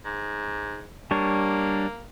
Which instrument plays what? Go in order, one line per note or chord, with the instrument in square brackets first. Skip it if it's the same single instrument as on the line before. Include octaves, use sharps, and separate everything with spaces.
[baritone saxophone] G#2
[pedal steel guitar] G3 D4 C#5 [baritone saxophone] A#3